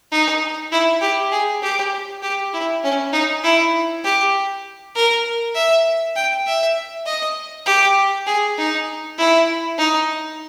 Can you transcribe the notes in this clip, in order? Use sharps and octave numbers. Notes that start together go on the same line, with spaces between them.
D#4
E4
G4
G#4
G4
G4
E4
C#4
D#4
E4
G4
A#4
E5
G5
E5
D#5
G4
G#4
D#4
E4
D#4